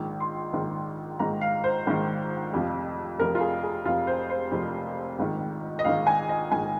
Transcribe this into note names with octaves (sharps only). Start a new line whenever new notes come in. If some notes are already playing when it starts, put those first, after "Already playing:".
Already playing: A#1 G#2 D#3
C6
A#1 G#2 D#3
A#1 G#2 D#3 A#5
F5
C5
A#1 G#2 D#3
F1 F2 C3 F3
F1 F2 C3 F3 A#4
F4
G#4
G#4
F1 F2 C3 F3 F4
C5
C5
F1 F2 C3 F3
A#1 G#2 D#3
D#5
A#1 G#2 D#3 F5
G#5
D#5
A#1 G#2 D#3 G#5